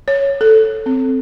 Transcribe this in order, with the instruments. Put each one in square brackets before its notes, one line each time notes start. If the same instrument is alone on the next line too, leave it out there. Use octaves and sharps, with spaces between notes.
[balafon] C#5
A4
C4